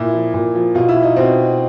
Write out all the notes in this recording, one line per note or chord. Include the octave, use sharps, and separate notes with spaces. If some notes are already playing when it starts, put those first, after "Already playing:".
Already playing: A#2 E4
F3
A#2
F3
B2 F4
E4
D#4
B2 C4